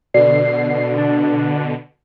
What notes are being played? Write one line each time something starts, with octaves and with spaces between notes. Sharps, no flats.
B2 D3 D5 C7
D4